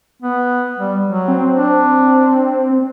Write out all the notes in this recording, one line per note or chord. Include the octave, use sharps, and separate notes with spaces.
B3
G3
F#3
C4
D4